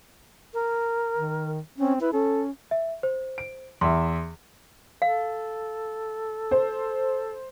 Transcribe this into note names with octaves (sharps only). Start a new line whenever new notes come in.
A#4
D#3
C4 C#4
E4 B4
C#4 A4
E5
C5
D7
E2 E5 C6
A4 F5
C5